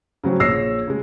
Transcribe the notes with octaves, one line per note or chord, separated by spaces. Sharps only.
C#3 F#3 C4 C#4
A#1 G#4 C#5 E6 A#6 C7
C#3 G#3